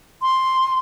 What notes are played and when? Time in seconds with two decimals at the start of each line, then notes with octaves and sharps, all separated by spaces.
0.22 C6